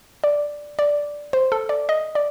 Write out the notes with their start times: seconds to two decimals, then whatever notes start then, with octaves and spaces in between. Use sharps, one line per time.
0.24 D5
0.79 D5
1.33 C5
1.52 A4
1.69 D5
1.89 D#5
2.15 D5